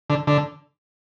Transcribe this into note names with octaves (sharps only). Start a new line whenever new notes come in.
D3
D3